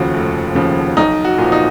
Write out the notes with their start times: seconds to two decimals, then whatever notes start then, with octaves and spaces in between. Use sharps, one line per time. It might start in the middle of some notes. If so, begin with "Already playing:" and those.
Already playing: F1 D#2 C#3 F3 F#4
0.14 F1
0.55 D#2 C#3 F3
0.97 B1 D#4
1.25 F#4
1.38 A#2 F3
1.52 D#4